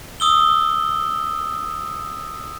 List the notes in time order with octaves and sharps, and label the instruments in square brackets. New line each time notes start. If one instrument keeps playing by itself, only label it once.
[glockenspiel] D#6 E6 G7